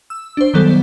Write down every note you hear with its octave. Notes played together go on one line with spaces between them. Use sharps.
E6
D4 C5
D#3 F#3 G3 B3 A4 C5